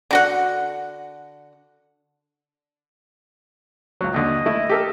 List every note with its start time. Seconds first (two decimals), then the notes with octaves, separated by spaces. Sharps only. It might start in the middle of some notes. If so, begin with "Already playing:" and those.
0.11 D3 F#4 F#5
4.01 C#2 F#3
4.14 D#2 D3 D#5
4.46 A3 E4
4.70 G4 A4 A#4